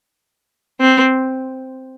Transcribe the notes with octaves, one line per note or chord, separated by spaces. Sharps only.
C4